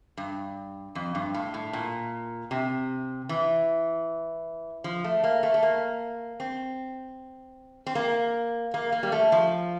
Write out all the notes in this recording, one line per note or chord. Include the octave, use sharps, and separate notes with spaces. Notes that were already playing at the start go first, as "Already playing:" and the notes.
G2
F2
G2
A2
A2
A#2
C3
E3
F3
A3
A#3
A3
A3
A#3
C4
C4
A#3
A#3
A#3
G3
A3
F3